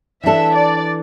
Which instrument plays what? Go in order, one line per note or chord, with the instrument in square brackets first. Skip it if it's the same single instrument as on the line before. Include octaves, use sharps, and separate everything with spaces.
[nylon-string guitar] E3 D4 A4 [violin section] E5
[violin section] D5